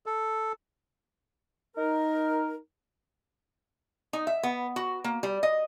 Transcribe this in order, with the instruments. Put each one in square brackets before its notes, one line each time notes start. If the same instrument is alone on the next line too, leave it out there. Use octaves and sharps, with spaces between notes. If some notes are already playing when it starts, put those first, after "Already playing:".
[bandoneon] A4
[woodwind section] D#4 A#4
[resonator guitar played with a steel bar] D#4
E5
B3
F#4
A#3
G3
D#5